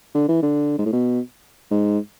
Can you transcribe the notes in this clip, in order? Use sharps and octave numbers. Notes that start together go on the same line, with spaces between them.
D3
E3
D3
G#2
A2
B2
G#2